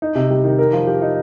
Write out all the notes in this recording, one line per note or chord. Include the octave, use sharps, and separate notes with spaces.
D#4
C3
G3
D#3
A#4
F3
G4
D#4